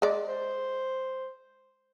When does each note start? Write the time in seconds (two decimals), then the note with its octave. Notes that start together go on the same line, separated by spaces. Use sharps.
0.02 G#3 D5
0.28 C5